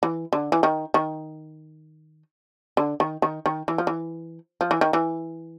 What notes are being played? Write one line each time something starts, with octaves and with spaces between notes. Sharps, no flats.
E3
D3
E3
D#3
D#3
D3
D#3
D#3
D#3
E3
F3
E3
F3
E3
D#3
E3